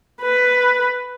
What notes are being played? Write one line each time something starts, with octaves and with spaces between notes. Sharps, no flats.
B4